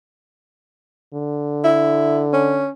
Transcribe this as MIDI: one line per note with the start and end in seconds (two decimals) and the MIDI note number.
1.14 2.68 50
1.64 2.23 64
2.33 2.69 61